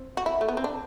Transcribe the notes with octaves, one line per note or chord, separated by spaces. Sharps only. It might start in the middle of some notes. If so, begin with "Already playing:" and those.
Already playing: C4
F#4
E4
A3
B3
C4
D4